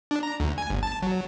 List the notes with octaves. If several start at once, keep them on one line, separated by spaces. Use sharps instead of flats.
D4
A#5
D2
G#5
G1
A5
F#3